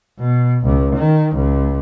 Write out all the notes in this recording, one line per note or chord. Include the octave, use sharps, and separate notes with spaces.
B2
C#2
D#3
C#2